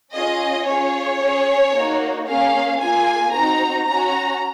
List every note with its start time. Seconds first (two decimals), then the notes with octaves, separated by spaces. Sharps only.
0.11 C#4 F4 G#4 D#5
0.65 C#4 F4 G#4 C#5
1.19 C#4 G#4
1.73 A#3 D#4 F#4
2.26 A#3 C#4 G#4 F5
2.79 A#3 F4 G#4 G#5
3.33 C4 D#4 F#4 A#5
3.87 C#4 F#4 A#5